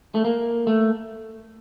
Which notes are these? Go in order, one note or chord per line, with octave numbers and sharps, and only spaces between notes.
A3
A#3
A3